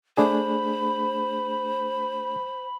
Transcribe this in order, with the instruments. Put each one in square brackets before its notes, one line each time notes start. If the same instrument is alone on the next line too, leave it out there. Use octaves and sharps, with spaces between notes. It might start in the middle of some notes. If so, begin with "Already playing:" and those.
[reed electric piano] A3 D4 G#4 [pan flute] C5 [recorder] B5